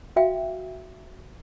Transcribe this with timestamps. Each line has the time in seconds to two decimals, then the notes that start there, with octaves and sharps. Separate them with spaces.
0.16 F#4 E5 F5 G5